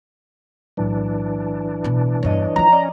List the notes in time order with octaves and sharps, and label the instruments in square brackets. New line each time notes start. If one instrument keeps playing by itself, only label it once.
[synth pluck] B1 A2 F#3 [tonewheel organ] E3 D4
[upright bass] B2 B3
[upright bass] E2 G2 [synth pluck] C#5 D#5
[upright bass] F3 F4 [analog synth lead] A#5
[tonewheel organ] C#4 [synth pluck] D5 D#5